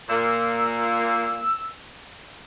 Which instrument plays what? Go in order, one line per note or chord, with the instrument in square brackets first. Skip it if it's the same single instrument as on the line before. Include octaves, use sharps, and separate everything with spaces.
[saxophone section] A#2 A#3 [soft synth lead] E6